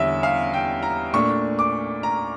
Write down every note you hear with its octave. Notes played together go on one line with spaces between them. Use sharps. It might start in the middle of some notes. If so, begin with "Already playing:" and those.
Already playing: E2 D3 G3 C#4 E5
F5
G5
A#5
A#2 A3 D4 C#6
D6
A#5